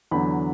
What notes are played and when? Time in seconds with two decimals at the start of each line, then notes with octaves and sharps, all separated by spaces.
0.11 E2 D3 F#3 B5